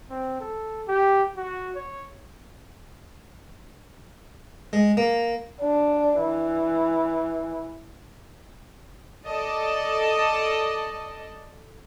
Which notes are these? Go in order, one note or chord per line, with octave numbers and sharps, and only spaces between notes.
C4
A4
G4
F#4
C#5
G#3
A#3
D4
E3
A4 D5 D#5 A5